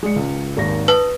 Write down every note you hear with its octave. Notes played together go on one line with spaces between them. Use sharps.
G#3 D5 C#7
C#2
G#1 D#2 A#6
B4 A5 D#6